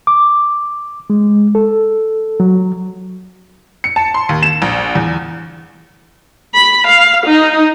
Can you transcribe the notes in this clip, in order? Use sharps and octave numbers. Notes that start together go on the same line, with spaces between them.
D6
G#3
A4
F#3
C#7
A5
C6
D#2
E7
A#1
E2
B5
F5
D#4